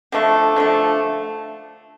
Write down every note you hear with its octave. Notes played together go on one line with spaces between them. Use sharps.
D3 F3 A3
D3 F3 A3